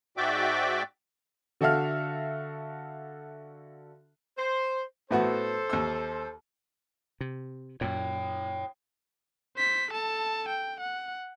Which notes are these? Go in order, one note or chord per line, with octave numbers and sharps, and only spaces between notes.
G#2 F#4 D5 E5 G5 D6
D3 F#4 A4 E5 F5 F6
C5
A2 B3 F#4 A4 C5
D#2 E6
C3
F#2 A#2 C#5 G5
C5 B6
A4 A5
G5
F#5